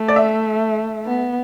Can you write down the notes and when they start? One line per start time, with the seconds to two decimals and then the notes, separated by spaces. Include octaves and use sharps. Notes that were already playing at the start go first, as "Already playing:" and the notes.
Already playing: A3
0.08 D5
0.16 E5
1.06 B3